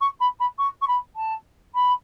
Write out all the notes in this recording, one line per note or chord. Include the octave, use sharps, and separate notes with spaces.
C#6
B5
B5
C#6
C#6
B5
A5
B5